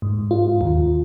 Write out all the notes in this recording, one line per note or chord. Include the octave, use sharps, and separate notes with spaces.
G#2
F4
D#2